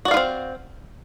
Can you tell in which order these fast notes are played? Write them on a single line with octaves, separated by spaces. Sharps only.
F#4 D5 F5 F4 C4